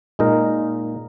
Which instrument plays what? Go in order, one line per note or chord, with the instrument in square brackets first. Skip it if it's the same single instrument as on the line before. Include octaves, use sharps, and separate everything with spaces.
[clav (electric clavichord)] A#2 G#3 D#4 A#4